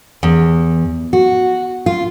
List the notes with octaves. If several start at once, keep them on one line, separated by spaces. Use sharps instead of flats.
E2
F#4
F4